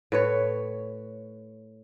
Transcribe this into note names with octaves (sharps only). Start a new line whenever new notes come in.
A2 B4 C#5